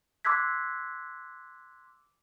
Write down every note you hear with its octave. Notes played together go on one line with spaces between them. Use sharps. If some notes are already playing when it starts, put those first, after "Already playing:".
C6 D6 E6 F#6 G#6 B6